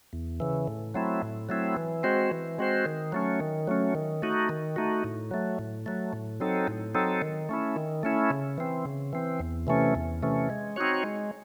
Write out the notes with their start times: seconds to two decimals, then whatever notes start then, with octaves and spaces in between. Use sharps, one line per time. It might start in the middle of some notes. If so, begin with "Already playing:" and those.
0.13 E2
0.40 C#3 E3
0.68 A2
0.94 F#3 A3 C4 E4
1.22 A2
1.49 F#3 A3 C4 E4
1.77 E3
2.03 G#3 C4 F#4 C5
2.31 E3
2.58 G#3 C4 F#4 C5
2.86 D#3
3.12 F#3 A3 C#4
3.40 D#3
3.67 F#3 A3 C#4
3.95 D#3
4.22 A3 D#4 F#4
4.49 D#3
4.76 A3 D#4 F#4
5.04 A2
5.31 F#3 A3
5.59 A2
5.86 F#3 A3
6.13 A2
6.40 F#3 C4 D#4 A4
6.68 A2
6.95 F#3 C4 D#4 A4
7.22 D#3
7.49 A3 C#4 E4
7.76 D#3
8.03 A3 C#4 E4
8.31 C#3
8.58 E3 C4
8.85 C#3
9.13 E3 C4
9.40 E2
9.67 C3 E3 A3 C#4
9.95 E2
10.22 C3 E3 A3 C#4
10.50 G#3
10.76 C4 D#4 F#4 C#5
11.04 G#3